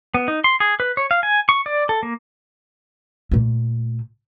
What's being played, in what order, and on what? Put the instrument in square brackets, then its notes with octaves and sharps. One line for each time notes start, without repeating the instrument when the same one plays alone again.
[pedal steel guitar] B3
D#4
C6
G#4
B4
C#5
F5
G#5
C#6
D5
A4
A#3
[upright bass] A#2 A3